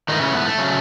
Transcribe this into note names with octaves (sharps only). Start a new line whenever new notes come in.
G#2 D#3 E3 A3 D#4
C#3 C#4
B3
A3
C#3 F#3